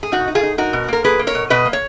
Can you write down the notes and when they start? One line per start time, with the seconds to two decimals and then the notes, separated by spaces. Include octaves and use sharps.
0.03 G#4
0.12 B2 D#4 F#4
0.28 D#4
0.35 F4 G#4
0.43 D#4
0.58 D#4 F#4 A#4
0.73 B2
0.88 A#3 A#4
1.04 A#3 G#4 B4
1.19 A#3
1.27 A#4 C#5
1.35 B2
1.50 B2 B4 D#5
1.65 A#3
1.73 C#5